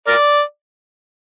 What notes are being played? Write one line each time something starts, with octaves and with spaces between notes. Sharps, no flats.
A#4 D5